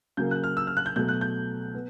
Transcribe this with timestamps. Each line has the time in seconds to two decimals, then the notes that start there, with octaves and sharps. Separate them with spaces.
0.17 C#3 F#3 A#3 G6
0.31 F#6
0.43 F6
0.57 E6
0.67 F6
0.77 F#6
0.86 G6
0.96 B2 F#3 A3 G6
1.08 F#6
1.21 G6
1.74 B3